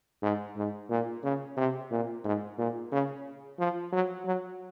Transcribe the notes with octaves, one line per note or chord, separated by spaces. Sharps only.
G#2
G#2
A#2
C#3
C3
A#2
G#2
A#2
C#3
F3
F#3
F#3